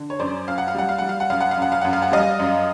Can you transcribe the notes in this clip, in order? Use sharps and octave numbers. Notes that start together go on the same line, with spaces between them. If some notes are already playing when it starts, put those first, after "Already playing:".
Already playing: D3
C#5
F#2 C5 D5
F#2 F5
F#5
F5
G3 F#5
F5
G3 F#5
F5
F#5
F#2 F5
F#5
F5
F#2 F#5
F5
F#2 F#5
F5
F#5
G3 D#5 F5
F#2